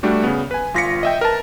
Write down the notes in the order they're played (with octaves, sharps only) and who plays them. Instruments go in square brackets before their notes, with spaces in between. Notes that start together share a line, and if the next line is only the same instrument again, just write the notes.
[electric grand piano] G3 A3 D4 F#4 G4
C#3 B3
B4 G#5
G1 F4 A#6 B6 C#7
D#5 E5 G5
A#4 B4 A5